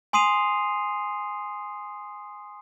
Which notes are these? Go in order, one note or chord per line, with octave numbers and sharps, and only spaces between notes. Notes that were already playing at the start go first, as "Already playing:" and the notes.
G#5 C6 D#6 C7 D#7 F7